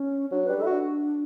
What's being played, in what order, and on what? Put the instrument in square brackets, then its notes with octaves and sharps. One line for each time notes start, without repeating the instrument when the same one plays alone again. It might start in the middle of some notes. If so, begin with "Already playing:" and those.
Already playing: [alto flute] C#4
[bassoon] F#3 [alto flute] D4
[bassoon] G3 [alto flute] B4
[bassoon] E4 [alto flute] A4
[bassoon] F#4
[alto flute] D4